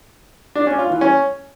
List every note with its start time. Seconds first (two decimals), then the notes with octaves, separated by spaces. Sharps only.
0.55 D4
0.67 C#4
0.78 F4
0.90 E3
1.01 C#4